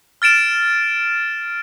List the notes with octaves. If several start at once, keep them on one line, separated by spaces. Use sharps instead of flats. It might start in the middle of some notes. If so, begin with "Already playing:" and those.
F6 A6 D7 E7